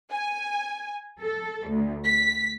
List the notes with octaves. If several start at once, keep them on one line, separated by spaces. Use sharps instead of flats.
G#5
A4
D2
B6